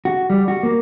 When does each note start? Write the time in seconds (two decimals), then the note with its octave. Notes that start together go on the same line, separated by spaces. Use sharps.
0.05 F#4
0.30 G3
0.48 F#4
0.63 A#3